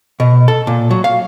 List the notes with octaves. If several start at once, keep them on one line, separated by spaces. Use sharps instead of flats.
B2
A4
A#2
F#3
F5